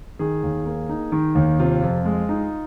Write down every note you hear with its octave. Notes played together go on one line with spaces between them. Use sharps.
D#3 G#4
D#2
A#3
D#4
D#3
D#2
C3 F4
F2
G#3
D#4